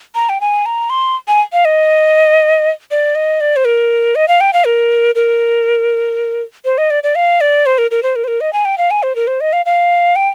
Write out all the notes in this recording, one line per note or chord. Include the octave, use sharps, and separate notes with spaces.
A#5
G5
G#5
A#5
C6
G#5
F5
D#5
D5
D#5
D5
C5
A#4
D#5
F5
G5
F5
A#4
A#4
C5
D#5
D5
D5
F5
D5
C5
A#4
A#4
C5
A#4
C5
A#4
D#5
G#5
G5
F5
G#5
C5
A#4
C5
D#5
F5
F5
G5